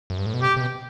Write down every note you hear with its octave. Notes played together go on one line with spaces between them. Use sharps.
F#2
G2
A2
B2
C3 G4
C3
B2